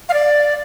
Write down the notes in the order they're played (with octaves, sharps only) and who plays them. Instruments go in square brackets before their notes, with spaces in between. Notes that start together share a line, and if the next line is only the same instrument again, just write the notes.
[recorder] F5
D5